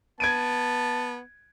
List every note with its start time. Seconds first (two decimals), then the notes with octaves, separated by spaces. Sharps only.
0.20 B3 A5 G#6 D7 D#7